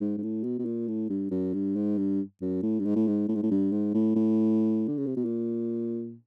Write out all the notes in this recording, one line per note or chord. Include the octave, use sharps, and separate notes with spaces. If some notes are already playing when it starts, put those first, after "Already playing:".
G#2
G#2
A2
B2
B2
A#2
A2
G2
F#2
G2
G#2
G2
F#2
A2
G2
G#2
A2
G#2
A2
G#2
A2
G2
G#2
A2
A2
D3
C#3
C3
B2
A#2